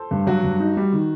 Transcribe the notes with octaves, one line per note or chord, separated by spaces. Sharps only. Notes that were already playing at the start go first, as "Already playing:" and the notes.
Already playing: A4 C5
G2
F#3 F#4
G2
D#4
G3
D#3